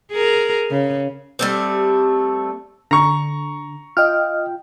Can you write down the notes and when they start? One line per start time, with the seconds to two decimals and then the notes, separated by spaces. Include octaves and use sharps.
0.12 G#4 A#4
0.71 C#3
1.39 G3 A3 C4
2.91 D3 A#5 C#6
3.97 F4 D#5 G5 F6